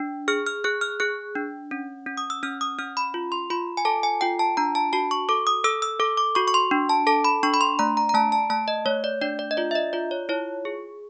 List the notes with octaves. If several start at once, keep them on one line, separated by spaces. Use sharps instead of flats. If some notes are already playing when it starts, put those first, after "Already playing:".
Already playing: D4
G#4 F6
F6
G#4 F#6
F6
G#4 F#6
D4
C#4
C#4
D#6
E6
C#4 F6
D#6
C#4 F6
B5
F4
C6
F4 B5
G#5
A4 A5
G#5
F4 G5
A5
D4 A#5
A5
F#4 A5
C#6
A4 D6
D#6
A4 E6
E6
A4 D6
D6
F#4 C#6
C#6
C6
D4
A5
A4 A5
B5
D4 C#6
B5
C6
A3 A#5
A#5
A#5
A3 A5
A5
A3 A5
D#5
A3 C#5
D5
D4 D5
D5
D#5
F4 D5
E5
D#5
F4 D5
C#5
E4 C#5
G#4